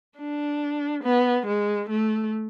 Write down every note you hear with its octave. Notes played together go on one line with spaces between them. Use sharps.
D4
B3
G#3
A3